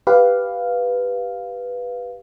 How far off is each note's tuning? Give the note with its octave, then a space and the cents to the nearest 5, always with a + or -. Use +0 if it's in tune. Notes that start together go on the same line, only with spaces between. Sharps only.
G4 +0 B4 +0 F5 +0